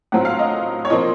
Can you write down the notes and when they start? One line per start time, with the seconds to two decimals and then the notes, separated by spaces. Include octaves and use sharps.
0.12 A2 F#3 C4 F4 F#5
0.25 F5
0.39 D#5
0.85 C#5
0.90 A#2 F3 C4 D#5